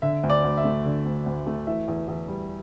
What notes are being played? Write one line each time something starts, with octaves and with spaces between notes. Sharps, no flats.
D3 E5
D2
D5
D2
E5
A3
D3
D2
D2
A3
E3 E5
E2
E2
G3